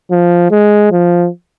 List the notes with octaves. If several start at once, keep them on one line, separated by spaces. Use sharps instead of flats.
F3
G#3
F3